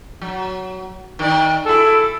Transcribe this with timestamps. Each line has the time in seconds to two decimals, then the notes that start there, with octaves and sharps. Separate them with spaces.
0.22 F#3
1.19 D#3 A#4 D5
1.66 E4 F#4 G#4 A4